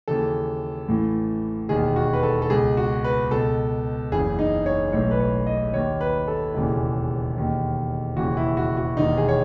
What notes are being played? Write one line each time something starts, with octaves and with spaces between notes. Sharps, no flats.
D#2 C#3 E3 A4
A1 A2 E3
E1 D#2 D#3 G#4
F#4
B4
A4
A4
C#2 B2 G#4
F#4
B4
C#2 B2 A4
F#1 E2 C#3 G#4
D#4
C#5
B1 A2 E3 C#5
B4
C#5
D#5
D#2 D#3 C#5
B4
A4
E1 D#2 C#3 E3
E1 D#2 D#3
E1 D#2 C#3 E3 F#4
E4
F#4
F#4
E1 D#2 D#3 D#4
G#4
C#5